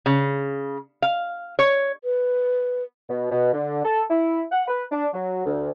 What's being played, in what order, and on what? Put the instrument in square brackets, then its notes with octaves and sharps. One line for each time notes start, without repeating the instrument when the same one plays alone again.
[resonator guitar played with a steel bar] C#3
F5
C#5
[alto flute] B4
[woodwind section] B2
B2
D3
A4
E4
F#5
B4
D4
F#3
D2